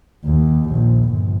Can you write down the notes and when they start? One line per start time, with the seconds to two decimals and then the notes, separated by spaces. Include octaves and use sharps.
0.24 D#2
0.70 A#1
1.10 G1